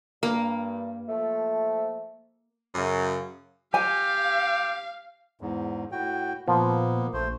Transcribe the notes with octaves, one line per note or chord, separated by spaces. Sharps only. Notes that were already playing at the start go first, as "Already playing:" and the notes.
G2 A#3
F3 A3
F#2 C#3
G4 F5 G#5
E2 G#2
A2 F#4 G5
A#2 F3 A#3 B3
A#1 A3 C5